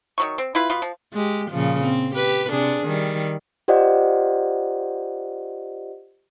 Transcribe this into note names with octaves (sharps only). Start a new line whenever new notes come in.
D#3 F#3 C#6
C4
E4 F4 B4
B2 F4 B4
F3
G#3 G4
A#2 C#3 F3
C4
G4 B4
C3 D4 G#4
D#3 G3
F4 G4 C5 D5 D#5 F#5